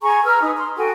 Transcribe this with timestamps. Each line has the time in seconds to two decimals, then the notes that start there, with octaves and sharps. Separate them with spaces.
0.02 G#4 G#5 A#5 C#6
0.24 B4 A#5 E6 F6
0.40 D#4 B4 D#6
0.58 C6
0.77 F#4 A4 G5 G#5